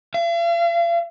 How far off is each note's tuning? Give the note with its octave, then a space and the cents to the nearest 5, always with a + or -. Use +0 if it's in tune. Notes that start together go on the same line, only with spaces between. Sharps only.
F5 -45